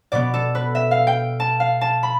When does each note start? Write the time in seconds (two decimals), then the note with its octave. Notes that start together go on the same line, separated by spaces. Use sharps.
0.12 B2 B3 D5
0.34 A4
0.55 B4
0.75 E5
0.91 F5
1.07 G5
1.40 A5
1.60 F5
1.81 A5
2.03 B5